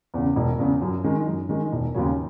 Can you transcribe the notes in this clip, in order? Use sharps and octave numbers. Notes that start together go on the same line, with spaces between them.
E2 C#3
E1
E2 C#3
F#2
D#3 G#3
F#2
D#3 G#3
E1
D#2 C#3 F#3 C#4